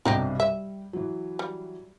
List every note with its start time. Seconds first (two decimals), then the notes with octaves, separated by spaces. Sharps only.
0.05 B1 G2 C3 F#3 D#4 G4
0.40 G3 E5
0.93 E3 F#3
1.39 G3